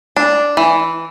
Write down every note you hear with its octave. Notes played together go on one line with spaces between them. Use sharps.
D4
E3